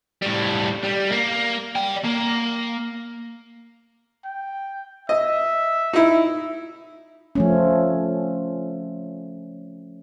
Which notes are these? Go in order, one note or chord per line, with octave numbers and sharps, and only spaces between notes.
A2 G3
G3
A#3
D5 G5
A#3
G5
D#5 E5
D#4 E4
F3 A3 C#4